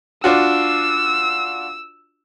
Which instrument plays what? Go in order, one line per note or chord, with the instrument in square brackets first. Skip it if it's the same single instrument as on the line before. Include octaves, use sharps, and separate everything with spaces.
[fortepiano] D4 F4 F#4 [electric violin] E6